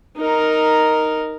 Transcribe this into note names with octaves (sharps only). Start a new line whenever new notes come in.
D#4 A#4